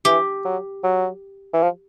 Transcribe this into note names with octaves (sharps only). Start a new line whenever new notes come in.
E3 G4
F#3
F#3
E3
F3